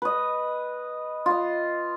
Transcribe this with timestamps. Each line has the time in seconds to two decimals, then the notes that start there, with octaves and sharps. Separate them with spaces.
0.02 B4 D#5
1.26 F4 D#5